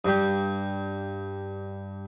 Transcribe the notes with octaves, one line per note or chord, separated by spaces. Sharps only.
G2 G4